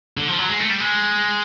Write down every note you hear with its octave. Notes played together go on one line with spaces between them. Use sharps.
D3
F3
F#3
G#3
A3
G3
G#3